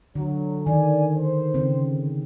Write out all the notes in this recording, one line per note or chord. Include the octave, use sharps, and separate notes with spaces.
D3 F#3
D#3 D5 G#5
C5
C#3 C4